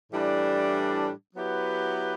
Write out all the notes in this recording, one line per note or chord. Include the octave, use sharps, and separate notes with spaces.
A2 E3 G3 D4
F#3 B3 E4 G4 B4